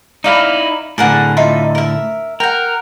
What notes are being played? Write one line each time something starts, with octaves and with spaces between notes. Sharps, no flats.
D#4 E4 D5 F5 B5
A2 D3 G#4 A#4 F#5
D#4 F4 E5
A#4 E5
A#4 F#5 G5